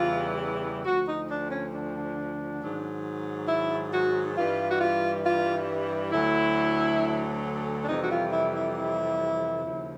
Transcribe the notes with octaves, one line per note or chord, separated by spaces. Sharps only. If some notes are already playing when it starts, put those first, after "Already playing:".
Already playing: E2 C#3 E3 G3 F4
D2 D3 F3 F#4
D#4
D4
C#4
D4
G#2 D#3 F#3
E4
F#4
G2 E3 G3 F4
F#4
F4
F4
D2 D3 F#3 E4
D4
F2 C3 E3 G3 D#4
F#4
F4
E4
E4
E4
D#2 C#3 F3